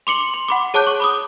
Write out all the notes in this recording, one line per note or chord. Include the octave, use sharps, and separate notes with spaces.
C6 D6 C#7 F#7
C6
F#5 B5 D6
G#4 C#5 A5 D6 F#6 G6
C#6
B5 D6 D#6